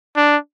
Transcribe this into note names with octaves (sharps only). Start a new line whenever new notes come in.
D4